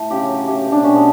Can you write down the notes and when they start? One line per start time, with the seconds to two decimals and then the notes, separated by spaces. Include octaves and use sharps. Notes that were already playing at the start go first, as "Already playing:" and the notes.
Already playing: A2 A3
0.11 C#3 G4
0.29 F#3
0.47 A3 G4
0.66 B2
0.72 D4
0.84 B2 C#4
0.96 B3